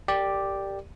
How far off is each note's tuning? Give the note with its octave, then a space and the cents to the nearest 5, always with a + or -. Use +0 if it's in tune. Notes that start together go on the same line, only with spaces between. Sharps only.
G4 +0 A#4 -35 D5 +0